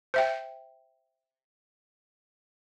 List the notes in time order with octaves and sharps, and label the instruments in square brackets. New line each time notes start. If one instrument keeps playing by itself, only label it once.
[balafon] C5 E5 G5